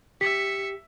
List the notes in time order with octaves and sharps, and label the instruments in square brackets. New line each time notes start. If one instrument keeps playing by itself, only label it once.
[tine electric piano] G4 [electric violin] E5 C#7 [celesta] B6